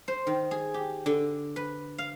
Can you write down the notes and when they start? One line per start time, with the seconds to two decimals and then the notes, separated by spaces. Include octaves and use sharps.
0.08 C5
0.27 D#3
0.51 G#4
0.74 G4
1.06 D3
1.56 B4
1.98 F5